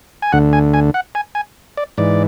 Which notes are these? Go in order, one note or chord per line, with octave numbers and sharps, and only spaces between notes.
G#5
D2 D3 F#5
G#5
G#5
F#5
G#5
G#5
D5
G#2 E3 D5